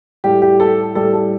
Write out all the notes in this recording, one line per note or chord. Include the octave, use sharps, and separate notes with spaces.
A2 G3 G4
G4
A4
A2 G3 A4
A4